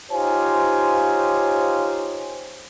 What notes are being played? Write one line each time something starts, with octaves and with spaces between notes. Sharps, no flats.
D#4 F4 G4 C5 C#5 G#5